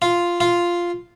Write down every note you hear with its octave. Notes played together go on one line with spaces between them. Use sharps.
F4
F4